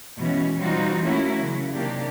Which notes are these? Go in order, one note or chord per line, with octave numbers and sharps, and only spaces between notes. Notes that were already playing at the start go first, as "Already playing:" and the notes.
B2 E3 G#3 B3 C#4
E3 G3 C4 D#4 F4 F#4
A3 A#3 C#4 E4 F#4
C#3 F#3
C3 D#3 A#3 D4 G4